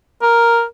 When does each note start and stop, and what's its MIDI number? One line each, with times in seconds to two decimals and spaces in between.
0.22 0.64 70